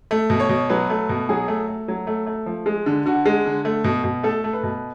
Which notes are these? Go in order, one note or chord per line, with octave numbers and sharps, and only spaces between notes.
A3
B2
C#5
B2
F#3 B4
A3
B2
F#3 G#4
A3
A3
F#3
A3
A3
F3
G#3
D3
D3 F#4
G#3
D3
A3
B2
B2
A3 A4
A3
B4
B2